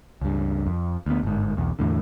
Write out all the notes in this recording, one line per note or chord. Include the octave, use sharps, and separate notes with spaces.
C#2 G2
F2
D2 B3
G1 G#2
B1 E2
E2 A2 D3